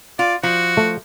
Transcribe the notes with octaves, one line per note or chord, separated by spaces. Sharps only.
F4 D5
F3 F#4
A3